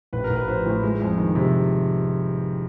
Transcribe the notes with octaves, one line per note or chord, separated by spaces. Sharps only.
A1 B4
A#4
A1
B4
F3 C5
A2
G#3
F2
D#3
C3